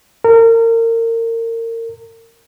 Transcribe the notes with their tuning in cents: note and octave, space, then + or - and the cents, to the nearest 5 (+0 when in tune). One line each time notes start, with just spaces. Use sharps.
A#4 -30